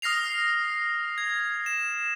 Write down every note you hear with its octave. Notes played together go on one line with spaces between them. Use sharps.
D#6 F6 A#6 C7 F7
G#6
E7